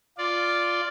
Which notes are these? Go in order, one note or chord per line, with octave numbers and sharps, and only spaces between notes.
F4 D5